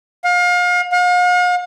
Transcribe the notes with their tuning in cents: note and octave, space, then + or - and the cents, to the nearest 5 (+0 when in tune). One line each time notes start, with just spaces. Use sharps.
F5 +35
F5 +45